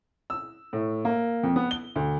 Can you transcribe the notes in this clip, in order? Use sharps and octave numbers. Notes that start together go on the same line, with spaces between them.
E6
A2
A#3
F2
B3
G7
D2